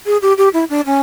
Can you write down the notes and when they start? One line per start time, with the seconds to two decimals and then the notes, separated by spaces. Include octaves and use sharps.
0.06 G#4
0.22 G4
0.38 G4
0.53 E4
0.70 D4
0.86 C#4